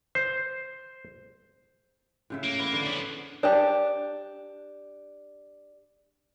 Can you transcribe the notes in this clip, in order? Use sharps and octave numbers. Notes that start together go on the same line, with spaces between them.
C5
A2 C#3 E5
A#3
E3 B3 E4
D3
F3 C#4 B4
D4 G4